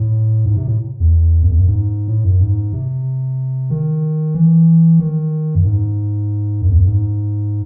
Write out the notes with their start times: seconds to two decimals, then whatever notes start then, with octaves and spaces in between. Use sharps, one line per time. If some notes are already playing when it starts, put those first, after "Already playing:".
Already playing: A2
0.46 G#2
0.57 C3
0.67 A2
1.00 E2
1.43 F#2
1.51 E2
1.59 F#2
1.67 G#2
2.08 A2
2.24 F#2
2.41 G#2
2.73 C3
3.70 D#3
4.35 E3
5.00 D#3
5.55 F#2
5.65 G#2
6.62 F#2
6.70 E2
6.78 F#2
6.86 G#2